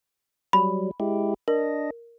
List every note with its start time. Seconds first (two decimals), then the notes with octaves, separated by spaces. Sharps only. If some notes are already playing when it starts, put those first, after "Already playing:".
0.53 F#3 G3 B5
1.00 G#3 E4 G4
1.48 D4 A#4 D#5